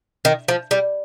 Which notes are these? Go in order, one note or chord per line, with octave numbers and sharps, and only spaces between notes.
D#3
F3
G3